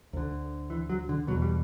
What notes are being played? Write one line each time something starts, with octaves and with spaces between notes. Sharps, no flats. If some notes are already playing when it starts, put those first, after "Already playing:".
D2 D3
E3
F#3
D3
E2 B2 F#3
G3